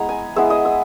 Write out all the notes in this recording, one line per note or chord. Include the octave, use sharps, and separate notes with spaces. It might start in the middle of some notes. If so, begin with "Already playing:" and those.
Already playing: G#3 B3 E4 A#5
G#5
G#3 B3 E4 E5
D#5
E5